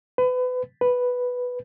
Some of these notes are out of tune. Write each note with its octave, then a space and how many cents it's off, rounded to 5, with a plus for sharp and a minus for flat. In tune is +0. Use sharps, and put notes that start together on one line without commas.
B4 +30
B4 +0